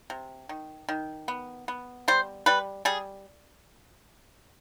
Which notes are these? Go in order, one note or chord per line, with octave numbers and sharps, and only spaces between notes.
C3
D#3
D#3
B3
B3
G3 C5
G3 B4
G3 G#4